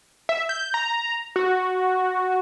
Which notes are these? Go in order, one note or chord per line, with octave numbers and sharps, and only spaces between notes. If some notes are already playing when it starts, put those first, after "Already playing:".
E5
G6
A#5
F#4